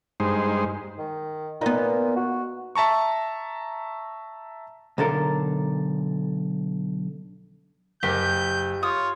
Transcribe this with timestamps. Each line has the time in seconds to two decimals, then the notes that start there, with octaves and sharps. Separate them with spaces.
0.20 G2 G#3 D#4 C5
0.98 D#3
1.61 A#2 B3 D#4
2.16 F#4
2.75 E5 A5 A#5 C#6
4.98 B1 D3 A4 A#4
8.03 F#1 G4 G6
8.83 F4 C#5 D#6